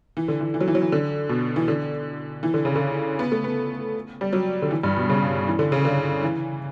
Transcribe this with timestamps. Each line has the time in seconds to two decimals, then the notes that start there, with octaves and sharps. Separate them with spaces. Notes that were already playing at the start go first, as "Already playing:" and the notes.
0.17 E3
0.28 D3
0.40 E3
0.54 E3
0.60 F#3
0.68 E3
0.75 F#3
0.82 E3
0.92 D3
1.29 B2
1.56 E3
1.68 D3
2.43 E3
2.54 D3
2.65 C#3
2.76 D3
3.19 B3
3.32 A3
3.44 B3
4.21 G3
4.33 F#3
4.62 D3
4.71 E3
4.83 G2
4.97 B2
5.09 C#3
5.47 E3
5.59 D3
5.72 C#3
5.85 D3
6.23 E3